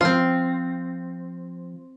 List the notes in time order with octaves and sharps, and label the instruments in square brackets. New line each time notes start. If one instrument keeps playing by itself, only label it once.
[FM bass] F3 [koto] C4 F4